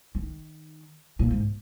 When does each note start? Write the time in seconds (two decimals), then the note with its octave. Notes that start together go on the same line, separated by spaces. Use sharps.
0.15 D#3
1.19 A#2
1.31 G#2